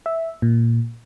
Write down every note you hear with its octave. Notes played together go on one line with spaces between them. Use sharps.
E5
A#2